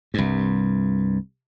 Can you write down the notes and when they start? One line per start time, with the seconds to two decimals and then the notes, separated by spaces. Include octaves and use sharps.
0.14 C2 G2